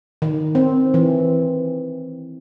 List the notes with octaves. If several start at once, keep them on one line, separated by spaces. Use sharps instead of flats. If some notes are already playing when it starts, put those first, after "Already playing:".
D#3
C4
E3